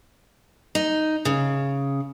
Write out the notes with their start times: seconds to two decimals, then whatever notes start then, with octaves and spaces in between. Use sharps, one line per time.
0.75 D#4
1.25 C#3